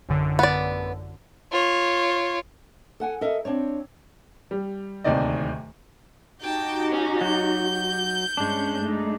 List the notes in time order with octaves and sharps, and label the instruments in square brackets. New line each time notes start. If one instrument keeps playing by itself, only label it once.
[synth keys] A1 F#2 D3
[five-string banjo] B3 D5
[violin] F4 C#5
[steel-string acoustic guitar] A4 F#5 G#5
A4 A#4 D#5 E5
C4 D4 C#5
[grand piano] G3
D1 D#2 C3 D#3 D5 D#5
[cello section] D#4 F#4 G4 [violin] G5 A5
[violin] C#4
[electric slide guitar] F#3 [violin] G6
[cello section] G2 C#4 [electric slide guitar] G#3 D4
[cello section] A3 D#4